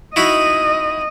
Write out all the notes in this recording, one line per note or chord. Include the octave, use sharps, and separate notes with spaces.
D#4 E4 F#4 D#5